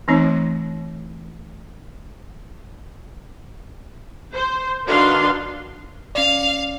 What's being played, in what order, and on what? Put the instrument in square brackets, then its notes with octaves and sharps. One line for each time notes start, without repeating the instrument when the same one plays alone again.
[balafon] E3 A3 C4 D#4 C#5
[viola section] C5
D#3 D4 F#4 B4 F5 C6
[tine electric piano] C#4 D5 [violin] F5